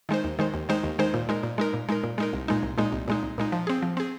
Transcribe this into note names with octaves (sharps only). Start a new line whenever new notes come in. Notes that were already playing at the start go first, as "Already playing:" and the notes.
D#3 G#3 D#4 C5
D#2
D#3 G#3 D#4 C5
D#2
D#3 G#3 D#4 C5
D#2
D#3 G#3 D#4 C5
A#2
G#3 D#4 A#4
A#2
G#3 D#4 A#4
A#2
G#3 D#4 A#4
A#2
G#3 D#4 A#4
C2
A#2 G#3 D#4
C2
A#2 G#3 D#4
C2
A#2 G#3 D#4
C2
A#2 G#3 D#4
F3
C4 G#4
F3
C4 G#4